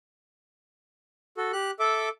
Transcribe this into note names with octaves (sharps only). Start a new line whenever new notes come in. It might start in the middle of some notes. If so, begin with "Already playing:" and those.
F#4 A4
G4 F#6
A4 E5 D6